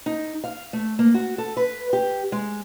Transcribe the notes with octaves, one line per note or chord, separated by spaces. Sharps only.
D#4
F5
A3
A#3
F#4
A4
B4
G4
G#3